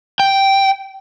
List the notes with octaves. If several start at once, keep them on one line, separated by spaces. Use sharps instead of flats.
G5